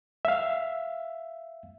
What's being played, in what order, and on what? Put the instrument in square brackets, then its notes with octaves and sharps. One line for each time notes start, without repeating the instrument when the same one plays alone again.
[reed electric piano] E5 F5